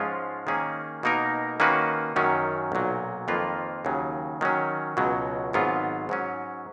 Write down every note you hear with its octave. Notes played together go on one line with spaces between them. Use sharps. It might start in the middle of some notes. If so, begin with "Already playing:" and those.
Already playing: G#2 F3 G#3 C#4 F4
D#3 A#3 C#4 G#4
B2 A#3 D#4 A#4
D#3 A#3 C#4 F#4 B4
F#2 D#3 F#3 C#4
B1 A#2 F#3
F2 D#3 A#3 F4 B4
D#2 C#3 F#3
D#3 F#3 C#4
C#2 B2 F#3
G#1 G#2 F#3 B3 F4
G#2 F#3 C#4